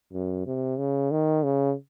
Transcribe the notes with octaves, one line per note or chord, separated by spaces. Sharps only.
F#2
C3
C#3
D#3
C#3